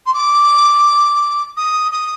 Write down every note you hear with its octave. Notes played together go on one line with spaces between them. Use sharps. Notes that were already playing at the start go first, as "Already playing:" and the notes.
C6
D6
D#6
D#6